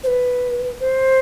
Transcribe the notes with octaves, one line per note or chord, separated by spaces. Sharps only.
C5
B4
C5